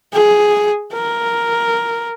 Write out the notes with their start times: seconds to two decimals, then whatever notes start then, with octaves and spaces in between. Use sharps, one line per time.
0.13 G#4
0.93 A#4